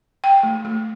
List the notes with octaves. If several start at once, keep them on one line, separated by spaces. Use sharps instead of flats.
G5
A3
A3